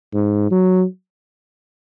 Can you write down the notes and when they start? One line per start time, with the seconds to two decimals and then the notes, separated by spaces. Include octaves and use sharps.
0.14 G#2
0.51 F#3